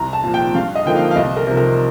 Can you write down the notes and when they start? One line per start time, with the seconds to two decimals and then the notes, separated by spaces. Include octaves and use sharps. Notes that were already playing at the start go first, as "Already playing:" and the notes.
Already playing: C2 A#5
0.13 A5
0.23 A#2 F3
0.34 G5
0.55 G2 F5
0.75 D#5
0.86 D3 F3 A#3 D#4 G5
0.96 F5
1.11 F5
1.16 C2 D#5
1.37 A#4
1.47 C3 F3
1.57 A#4